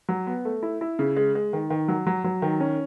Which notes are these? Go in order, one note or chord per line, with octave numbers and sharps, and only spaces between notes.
F#3
B3
A3
E4
E4
C#3
G#3
G#3
D#3
D#3
F#3
F#3
F#3
D#3
C#4